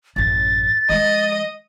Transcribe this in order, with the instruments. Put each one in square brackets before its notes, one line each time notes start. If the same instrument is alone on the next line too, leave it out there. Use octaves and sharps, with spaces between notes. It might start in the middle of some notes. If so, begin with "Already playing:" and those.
[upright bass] A1 F#2 [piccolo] A6
[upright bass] F3 G#3 [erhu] D#5